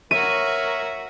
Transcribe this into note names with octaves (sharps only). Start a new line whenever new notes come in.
F#4 A#4 C#5 E5 D#7